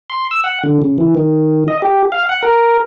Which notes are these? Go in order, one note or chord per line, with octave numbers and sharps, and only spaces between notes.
C6
E6
F#5
D3
C#3
E3
D#3
D#5
G4
F5
F#5
A#4